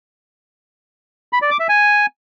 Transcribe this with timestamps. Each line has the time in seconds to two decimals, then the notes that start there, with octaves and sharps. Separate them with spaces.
1.33 B5
1.42 D5
1.51 D6
1.60 E5
1.69 G#5